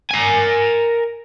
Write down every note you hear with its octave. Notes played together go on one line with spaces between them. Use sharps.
A#4 G#5